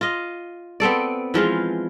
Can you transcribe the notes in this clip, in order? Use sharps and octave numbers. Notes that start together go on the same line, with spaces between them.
F4 D#5
B3 C4 A4 D5
E3 F3 G#3 F4